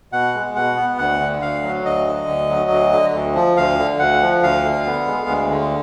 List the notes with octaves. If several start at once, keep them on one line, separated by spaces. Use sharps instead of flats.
B2 F#5
G#3
B2 F#5
B3
D2 F#5
D3
D2 F5
F#3
D2 D#5
D3
D2
F#3
D2
D3
D2
F3
D2 F5
D3
D2 F#5
F3
D2 F5
D3
B3
G#3
D2
D3